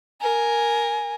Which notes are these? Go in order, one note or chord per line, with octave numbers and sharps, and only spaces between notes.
A#4 G#5